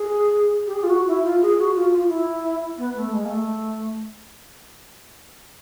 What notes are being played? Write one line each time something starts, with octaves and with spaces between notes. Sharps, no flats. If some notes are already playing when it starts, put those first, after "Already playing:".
Already playing: G#4
G4
G#4
F4
F#4
E4
F4
G#4
F#4
F4
F4
E4
B3
A3
G#3
A#3
A3